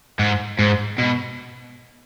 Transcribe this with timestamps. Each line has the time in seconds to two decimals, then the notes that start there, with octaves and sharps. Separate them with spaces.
0.19 G#2
0.59 G#2
0.98 B2